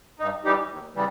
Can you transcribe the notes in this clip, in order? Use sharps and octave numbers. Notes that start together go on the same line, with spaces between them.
G2 D#4
E3 G3 D#4 G4
D#2
C#3 E3 G3